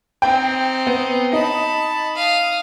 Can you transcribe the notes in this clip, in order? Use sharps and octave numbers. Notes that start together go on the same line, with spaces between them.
C4 D#4 G5
B3
D#4 A5 B5
F5 D#6